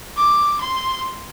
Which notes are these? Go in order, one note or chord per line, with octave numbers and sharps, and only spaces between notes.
D6
C6